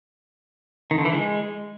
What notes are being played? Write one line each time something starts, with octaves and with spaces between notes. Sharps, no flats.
D#3
D3
E3
G#3